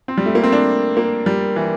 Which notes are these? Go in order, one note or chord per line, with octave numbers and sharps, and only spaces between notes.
C4
G3
A3
A#3
C4
D4
A#3
G3
E3